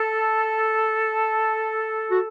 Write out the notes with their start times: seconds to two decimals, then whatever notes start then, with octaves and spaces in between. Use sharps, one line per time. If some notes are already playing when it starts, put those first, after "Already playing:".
Already playing: A4
2.10 F#4